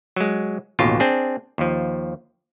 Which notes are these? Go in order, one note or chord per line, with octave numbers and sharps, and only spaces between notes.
F#3 G#3
A1 D#2 B2 F4
C4 D4 G#4
D#2 F3